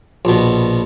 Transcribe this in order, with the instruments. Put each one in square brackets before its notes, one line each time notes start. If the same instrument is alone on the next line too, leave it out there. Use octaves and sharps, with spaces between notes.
[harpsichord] A#1 B2